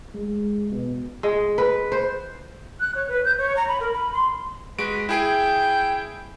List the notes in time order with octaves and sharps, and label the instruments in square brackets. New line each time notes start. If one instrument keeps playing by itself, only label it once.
[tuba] G#3
B2
[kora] G#3
B4
C5
[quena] F#6
C#5
B4
G6
C#5
A#5
B5
A#4
B5
C6
[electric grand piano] G#3 F#4 D7 [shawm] B4
[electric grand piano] E4 G#4 D7 [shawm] G5
[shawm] G5